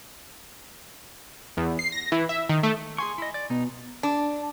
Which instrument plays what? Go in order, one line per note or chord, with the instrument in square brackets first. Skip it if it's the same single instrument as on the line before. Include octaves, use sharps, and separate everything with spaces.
[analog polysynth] E2
C7
A#6
E3
E5
D#3
A3
[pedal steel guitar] G#4 C#6 [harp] G#5 C6
[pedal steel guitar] E4 D#5
D5
[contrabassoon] B2 [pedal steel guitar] D#4
[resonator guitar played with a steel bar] D4